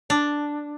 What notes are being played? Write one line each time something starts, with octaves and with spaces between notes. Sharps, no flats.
D4